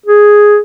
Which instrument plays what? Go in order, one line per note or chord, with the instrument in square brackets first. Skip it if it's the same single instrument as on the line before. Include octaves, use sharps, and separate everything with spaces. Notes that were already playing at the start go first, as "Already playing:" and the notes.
[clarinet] G#4